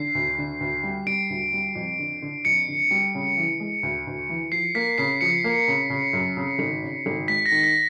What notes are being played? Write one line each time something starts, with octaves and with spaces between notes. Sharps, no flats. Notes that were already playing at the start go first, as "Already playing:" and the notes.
Already playing: D3 C7
D2
D3
D2
G3
G3 D7
D2
G3
F2
D3
D3
F2 C#7
D3
G3
C#3
E3
G#3
D2
D2
E3
F3 C7
A#3 B6
C#3 C7
F3 C#7
A#3
C#3
C#3
F#2
C#3
G#1
C#3
G#1
G#3 B6
A#6
D#3
B6